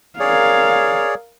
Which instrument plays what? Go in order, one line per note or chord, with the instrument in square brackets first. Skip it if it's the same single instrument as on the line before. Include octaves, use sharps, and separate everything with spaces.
[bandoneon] G#4 C#5 D5 [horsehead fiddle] A#4 F5